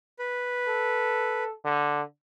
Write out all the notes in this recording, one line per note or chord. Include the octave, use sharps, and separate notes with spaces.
B4
A4
D3